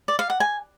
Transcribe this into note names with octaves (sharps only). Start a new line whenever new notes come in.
D5
F5
F#5
G#5